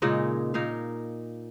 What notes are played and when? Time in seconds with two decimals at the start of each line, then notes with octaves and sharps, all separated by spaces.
0.02 A#2 C#3 G#3 D#4
0.54 A#2 D#4 A#4 F5